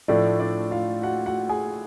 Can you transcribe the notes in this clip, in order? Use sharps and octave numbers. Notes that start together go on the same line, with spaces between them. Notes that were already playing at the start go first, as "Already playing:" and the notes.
A2 F3 A3 D4 D5
D4 D5
F4 F5
F#4 F#5
F#4 F#5
G#4 G#5